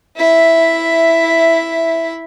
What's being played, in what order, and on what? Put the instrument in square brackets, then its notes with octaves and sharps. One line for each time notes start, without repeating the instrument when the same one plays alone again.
[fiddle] E4 E5